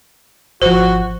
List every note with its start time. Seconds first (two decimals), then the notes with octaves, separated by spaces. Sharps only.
0.62 G#1 F3 F#4 C5